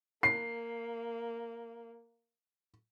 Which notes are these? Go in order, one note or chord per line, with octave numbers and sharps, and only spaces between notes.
A#3 C7